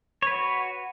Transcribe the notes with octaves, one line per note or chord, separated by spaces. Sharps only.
F#4 B4 C#5